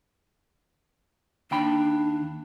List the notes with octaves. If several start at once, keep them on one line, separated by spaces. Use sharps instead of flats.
D#2 D4 G5 B5